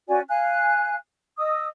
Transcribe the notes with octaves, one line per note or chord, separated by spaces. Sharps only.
C#4 F#4 D5 G#5
F5 G#5 F#6
D#5 D#6 E6